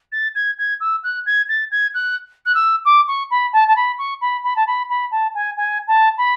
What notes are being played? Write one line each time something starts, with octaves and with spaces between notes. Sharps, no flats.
A6
G#6
G#6
E6
F#6
G#6
A6
G#6
F#6
F#6
E6
D6
C#6
B5
A5
A5
B5
C#6
B5
B5
A5
B5
B5
A5
G#5
G#5
A5
B5